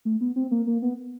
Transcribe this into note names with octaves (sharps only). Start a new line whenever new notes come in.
A3
B3
C4
A#3
A#3
B3